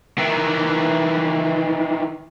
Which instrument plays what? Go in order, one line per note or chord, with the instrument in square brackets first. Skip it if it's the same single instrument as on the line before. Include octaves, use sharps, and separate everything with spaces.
[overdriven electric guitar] D#3 E3